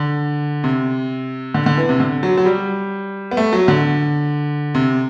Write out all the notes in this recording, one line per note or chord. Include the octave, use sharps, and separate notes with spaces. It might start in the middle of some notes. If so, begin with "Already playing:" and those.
Already playing: D3
C3
D3
D3
E3
C3
D3
F#3
F#3
G3
B3
A3
F#3
D3
C3